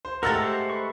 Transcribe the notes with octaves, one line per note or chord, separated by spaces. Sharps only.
C5
G#3 A3 G4 A#4 F#5 A#5 E6 A6
C5
B4 C#6